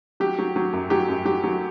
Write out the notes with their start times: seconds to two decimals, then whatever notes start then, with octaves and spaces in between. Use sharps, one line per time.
0.20 F#3 G4
0.39 F#3
0.56 F#3
0.73 F#2
0.90 F#3 G4
1.09 F#2
1.25 F#3 G4
1.44 F#3